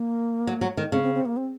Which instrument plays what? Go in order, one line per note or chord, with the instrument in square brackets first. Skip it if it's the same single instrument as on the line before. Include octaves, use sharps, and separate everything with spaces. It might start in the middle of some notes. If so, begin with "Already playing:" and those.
Already playing: [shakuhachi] A#3
[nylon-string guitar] F#3
F#3
D#3
[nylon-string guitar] C#3 [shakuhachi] C4
[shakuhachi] C4
C4
A#3
C4